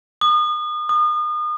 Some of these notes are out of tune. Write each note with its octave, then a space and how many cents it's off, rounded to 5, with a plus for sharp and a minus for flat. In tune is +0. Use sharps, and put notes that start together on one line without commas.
D#6 -35
D#6 -35